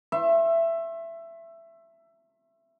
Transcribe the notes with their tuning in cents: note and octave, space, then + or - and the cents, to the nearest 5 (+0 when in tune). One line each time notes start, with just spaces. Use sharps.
E5 +15 C6 +45